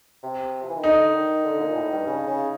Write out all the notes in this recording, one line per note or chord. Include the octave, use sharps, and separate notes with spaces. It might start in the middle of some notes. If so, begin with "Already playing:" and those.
C3
F3
E3
D#3
D3 D#4
D#3
D3
A#2
A2
G2
C#3
C#3